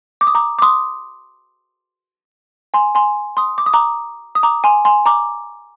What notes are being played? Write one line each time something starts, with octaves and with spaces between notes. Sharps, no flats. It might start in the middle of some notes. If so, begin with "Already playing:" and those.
D6
D#6
A#5 D6
D6
C6 D#6
G#5 C6
G#5 C6
C6 D#6
D6
D#6
A#5 D6
D#6
A#5 D6
G#5 C6
G#5 C6
A#5 D6